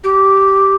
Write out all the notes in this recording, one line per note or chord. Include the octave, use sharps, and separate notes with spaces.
G4